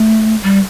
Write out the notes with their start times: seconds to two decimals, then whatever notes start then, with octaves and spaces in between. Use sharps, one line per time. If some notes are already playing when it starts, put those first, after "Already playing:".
Already playing: A3
0.43 G3